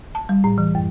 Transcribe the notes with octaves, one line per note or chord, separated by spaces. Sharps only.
A5
G3
A2
E3
F#2